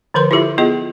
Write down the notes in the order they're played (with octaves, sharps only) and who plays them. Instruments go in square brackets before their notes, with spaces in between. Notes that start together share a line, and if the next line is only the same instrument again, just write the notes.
[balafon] D3 F3 A#4 B4 C6
E4 F4 G4 A4 E5
B3 F4 G#4 D#5